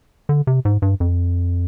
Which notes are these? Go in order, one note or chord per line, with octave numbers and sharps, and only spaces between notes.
D3
C3
G#2
G2
F2